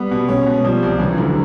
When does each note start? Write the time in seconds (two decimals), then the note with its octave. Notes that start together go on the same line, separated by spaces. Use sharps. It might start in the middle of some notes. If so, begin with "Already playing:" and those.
Already playing: G3 B3
0.11 B2
0.28 G#3 C#4
0.46 B2
0.64 F3 G3
0.83 C2
0.99 E3 G3
1.10 F#3
1.18 D2 F3
1.29 F#3